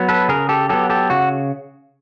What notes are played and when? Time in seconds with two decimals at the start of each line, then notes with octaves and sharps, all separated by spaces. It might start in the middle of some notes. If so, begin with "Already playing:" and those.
Already playing: F#3 B3
0.09 A4 B4
0.29 C#3 G#4 A#4
0.49 G4 A4
0.69 F#3 B3 G4 A4
0.90 G4 A4
1.10 C#3 F#4